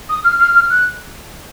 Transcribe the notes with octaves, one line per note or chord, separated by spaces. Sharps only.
D#6
F6
F6
F6
F#6